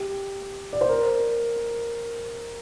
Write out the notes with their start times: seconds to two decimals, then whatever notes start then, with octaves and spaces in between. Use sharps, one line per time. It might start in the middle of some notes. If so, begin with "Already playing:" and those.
Already playing: G4
0.73 D5
0.81 C5
0.89 A#4